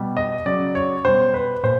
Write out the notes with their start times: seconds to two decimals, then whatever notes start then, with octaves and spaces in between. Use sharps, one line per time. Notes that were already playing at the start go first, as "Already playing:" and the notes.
Already playing: B2 G3
0.17 D#5
0.46 C#3 F#3 D5
0.75 C#5
1.04 B2 G3 C5
1.34 B4
1.63 A#2 C5